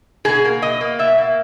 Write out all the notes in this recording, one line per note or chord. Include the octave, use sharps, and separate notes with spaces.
B2 G#4
A#3
B2 D#5
A#3
B2 E5
A#3